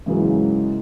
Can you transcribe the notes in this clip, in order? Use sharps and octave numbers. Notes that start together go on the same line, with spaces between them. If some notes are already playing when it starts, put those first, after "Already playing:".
G#2 C#3 E3 F#3 A#3